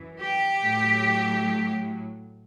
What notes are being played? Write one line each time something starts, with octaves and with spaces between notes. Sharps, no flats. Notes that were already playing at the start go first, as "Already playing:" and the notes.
Already playing: F#2 E3
G4
A2 F#3